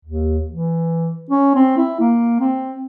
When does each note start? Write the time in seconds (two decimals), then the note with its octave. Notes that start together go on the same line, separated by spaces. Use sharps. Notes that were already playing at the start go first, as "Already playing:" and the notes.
0.05 D#2
0.51 E3
1.30 C#4
1.55 C4
1.77 E4
2.00 A#3
2.40 C4